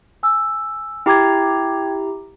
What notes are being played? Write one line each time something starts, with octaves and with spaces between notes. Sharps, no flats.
G#5 E6
E4 G4 G5 A#5 D6 G#6